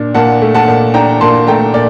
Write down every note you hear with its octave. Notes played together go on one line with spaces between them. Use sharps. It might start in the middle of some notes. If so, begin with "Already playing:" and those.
Already playing: A#2 D4
A#2 F#5 A5
A3
F#5 A5
A#2
D4 G5 A#5
A#2 A5 C6
A3 G5 A#5
A#2 D5